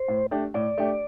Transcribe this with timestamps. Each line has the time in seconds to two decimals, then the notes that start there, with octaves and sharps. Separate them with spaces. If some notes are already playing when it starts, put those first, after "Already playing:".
Already playing: C5
0.08 A2
0.31 A3 D4 G4
0.54 A2 D5
0.78 A3 D4 G4